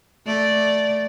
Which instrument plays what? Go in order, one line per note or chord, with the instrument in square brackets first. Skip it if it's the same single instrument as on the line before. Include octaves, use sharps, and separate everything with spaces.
[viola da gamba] A3 D5